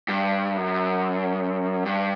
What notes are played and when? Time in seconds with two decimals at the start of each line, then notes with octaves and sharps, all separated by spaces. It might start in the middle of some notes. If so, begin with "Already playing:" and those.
0.08 G2
0.57 F#2
1.86 G2